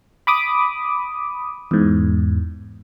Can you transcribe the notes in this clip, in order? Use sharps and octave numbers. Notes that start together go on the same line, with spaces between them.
B5 D6 D#6
E2 G#2